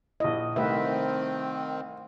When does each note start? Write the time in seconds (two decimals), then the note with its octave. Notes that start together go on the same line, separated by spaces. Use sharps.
0.20 A#1 E4 D#5
0.56 C2 D#3 A3 C4 B4 E5